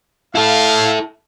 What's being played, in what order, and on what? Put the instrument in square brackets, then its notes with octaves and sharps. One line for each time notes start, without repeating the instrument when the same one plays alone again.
[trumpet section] A3 F5 [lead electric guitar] E4 A4